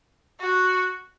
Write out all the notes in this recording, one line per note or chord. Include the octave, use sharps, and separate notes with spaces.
F#4